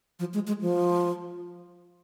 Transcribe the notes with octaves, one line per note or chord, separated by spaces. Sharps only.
F3
G#3
G#3
F3